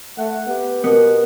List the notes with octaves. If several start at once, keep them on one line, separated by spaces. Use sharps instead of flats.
A3 F#5
B3 G4
B2 B3 A#4